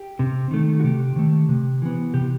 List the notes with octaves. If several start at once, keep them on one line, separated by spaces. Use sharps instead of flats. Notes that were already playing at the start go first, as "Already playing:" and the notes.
Already playing: G4
C3
D#3 A3
F#4
C3 G4
D#3 A3
C3
E3 B3
C3 G4